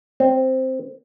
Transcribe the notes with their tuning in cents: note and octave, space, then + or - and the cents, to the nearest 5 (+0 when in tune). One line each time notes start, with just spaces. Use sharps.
C4 +0